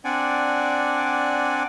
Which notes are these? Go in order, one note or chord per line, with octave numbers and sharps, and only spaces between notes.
C4 D4 D5 F#5 G#5